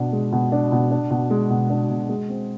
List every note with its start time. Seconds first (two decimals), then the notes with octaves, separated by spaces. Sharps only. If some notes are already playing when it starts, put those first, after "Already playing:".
Already playing: B2 D4
0.12 G#3
0.32 B2
0.52 D4
0.72 B2
0.91 D4
1.11 B2
1.30 G#3
1.50 B2
1.70 D4
1.89 B2
2.09 G#3
2.29 C4